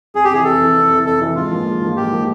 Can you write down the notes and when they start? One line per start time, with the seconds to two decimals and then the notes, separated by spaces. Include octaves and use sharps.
0.14 F2 G#4
0.24 G4
0.30 C3 E3 G#4
0.44 F2 A4
0.60 C3 E3
0.76 F2
0.90 C3 E3
1.06 F2 A4
1.21 C3 E3
1.36 G#2 F4
1.51 F3 A#3
1.66 G#2
1.82 F3 A#3
1.97 G#2 G4
2.12 F3 A#3